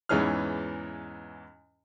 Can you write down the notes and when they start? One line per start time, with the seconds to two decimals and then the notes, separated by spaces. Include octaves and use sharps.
0.09 E2 G#2 E3 C#4 G#4 F6